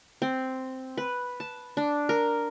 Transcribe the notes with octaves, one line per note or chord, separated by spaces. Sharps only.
C4
B4
A5
D4
A#4